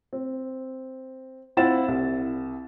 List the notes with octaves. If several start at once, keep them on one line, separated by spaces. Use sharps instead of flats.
C4
C4 E4 F4 F#5 A6 E7
C2